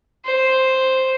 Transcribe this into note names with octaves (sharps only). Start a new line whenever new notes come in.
C5